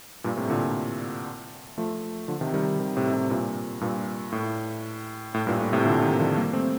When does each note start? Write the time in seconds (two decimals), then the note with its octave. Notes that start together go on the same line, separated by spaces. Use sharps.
0.24 G2 A#2
0.37 A2 C3
0.50 A#2 D3
1.78 F3 A3
2.28 D3 F3
2.41 C3 D#3
2.54 D#3 G3
2.79 C3 D#3
2.96 A2 C3
3.14 A2 C3
3.30 G2 A#2
3.81 G2 A#2
4.32 A2
5.34 A2
5.47 G2 A#2
5.60 A2
5.72 A2 C3
5.85 A#2 D3
6.02 C3 D#3
6.19 D3 F3
6.36 G3 A#3
6.53 A3 C4